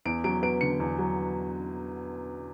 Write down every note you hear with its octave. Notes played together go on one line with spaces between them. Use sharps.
E2 D7
F#3 D7
B3 D7
D3 C#7
E2
F#3